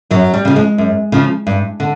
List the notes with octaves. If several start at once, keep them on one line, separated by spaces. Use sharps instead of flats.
F#2 F#3
G3
C#3 F3
G#3
F#2
C#3 F3
G2
D3